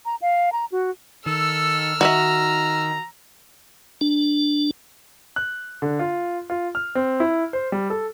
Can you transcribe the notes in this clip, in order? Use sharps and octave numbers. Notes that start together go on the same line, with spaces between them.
A#5
F5
A#5
F#4
D#3 A4 E6 F6
D#3 F#4 D#5 E5 A#5
D4
F#6
D3
F4
F4
F6
C4
E4
C5
G3
A4